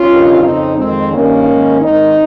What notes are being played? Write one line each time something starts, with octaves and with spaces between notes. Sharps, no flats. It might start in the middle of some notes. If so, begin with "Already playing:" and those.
Already playing: C#4 F4
G2 D#3
F2 C#3 C4 D#4
F2 D#3 G#3 C4
G2 D#3 A#3 C#4
G#2 D#3
G#2 D#3 C4 D#4